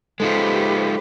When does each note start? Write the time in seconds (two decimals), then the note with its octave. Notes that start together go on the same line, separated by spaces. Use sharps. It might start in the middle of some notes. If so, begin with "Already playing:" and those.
0.20 G#3 D#4 F4 G4 A4 B4 C5